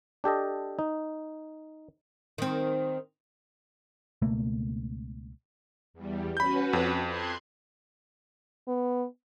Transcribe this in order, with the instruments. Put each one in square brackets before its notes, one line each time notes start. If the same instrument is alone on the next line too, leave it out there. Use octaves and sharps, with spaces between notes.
[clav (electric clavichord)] D4 G4 A4 D#5
D#4
[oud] D#3 C4
[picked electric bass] C#2 B2 A3 A#3
[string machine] E2 G3
[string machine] C#4 F#4 B4 [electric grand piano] B5 G6
[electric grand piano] F2
[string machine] C6 F#6 G#6
[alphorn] B3